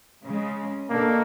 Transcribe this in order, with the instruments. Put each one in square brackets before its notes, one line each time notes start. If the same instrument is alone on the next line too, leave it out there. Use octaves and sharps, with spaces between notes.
[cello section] C#3 G#3
[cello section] B2 D4 A4 [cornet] A#3